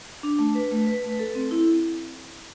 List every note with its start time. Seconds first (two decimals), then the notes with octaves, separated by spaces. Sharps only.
0.23 D4
0.39 A3
0.55 B4
0.71 A3
0.87 B4
1.03 A3
1.19 A4
1.35 C4
1.51 E4